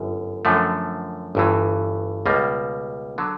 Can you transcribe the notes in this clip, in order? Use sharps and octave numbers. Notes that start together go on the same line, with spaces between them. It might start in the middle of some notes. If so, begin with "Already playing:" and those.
Already playing: G1 F#2
F#2 D3 F3 A3
G1 G2 E3
C#2 B2 G3 A#3
D3 F#3